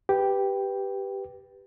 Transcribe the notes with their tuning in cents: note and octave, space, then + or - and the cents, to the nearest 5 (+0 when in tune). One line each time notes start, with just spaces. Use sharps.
G4 +0 B4 +0